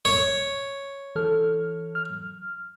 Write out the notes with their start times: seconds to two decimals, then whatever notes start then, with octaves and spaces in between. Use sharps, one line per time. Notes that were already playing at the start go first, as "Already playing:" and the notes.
0.05 C#5
1.16 E3 A4 F6
1.95 F6